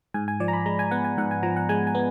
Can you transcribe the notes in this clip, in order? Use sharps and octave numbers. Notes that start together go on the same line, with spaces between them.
G#2 G#5
G#5
F3 D5
A#5
B5
G#3 A#5
G#5
B3 F#5
G#5
G#2 F#5
G#5
F3 A#5
F#5
G#3 G#5
G#5
B3